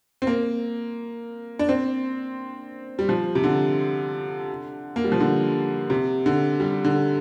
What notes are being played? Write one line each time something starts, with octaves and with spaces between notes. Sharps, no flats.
C4
A#3
D4
C4
G3
F3
C3
D3
A#3
G3
F3
D3
C3
D3
G3
D3